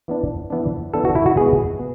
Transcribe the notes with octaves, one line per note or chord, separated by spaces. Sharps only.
E3 B3 D4
E3 B3 D4
E3 B3 D4 A4
F#4
E4
F#4
B2 G#3 B3 G#4
B3